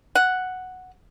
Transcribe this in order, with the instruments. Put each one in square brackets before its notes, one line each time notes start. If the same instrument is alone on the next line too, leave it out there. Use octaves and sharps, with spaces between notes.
[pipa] F#5